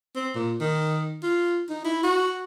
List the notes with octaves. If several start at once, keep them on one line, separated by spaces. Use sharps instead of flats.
C4
A#2
D#3
F4
D#4
E4
F#4